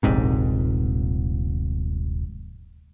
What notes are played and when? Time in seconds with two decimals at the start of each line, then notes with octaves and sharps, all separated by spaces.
0.03 D#1 A#1 G#2 C3